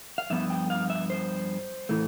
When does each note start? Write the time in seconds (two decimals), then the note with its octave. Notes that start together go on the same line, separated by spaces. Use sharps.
0.18 F5
0.30 G2 F3 B3 E5
0.50 G5
0.70 F5
0.90 E5
1.10 C5
1.89 A2 E3 A3